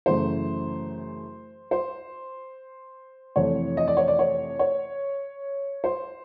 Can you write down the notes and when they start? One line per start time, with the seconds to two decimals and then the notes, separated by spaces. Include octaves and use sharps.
0.06 F#2 C#3 E3 A3 C5
1.71 C5
3.36 F2 C3 E3 A3 C#5
3.77 D#5
3.88 D5
3.97 C#5
4.08 D5
4.19 C#5
4.59 C#5
5.84 C5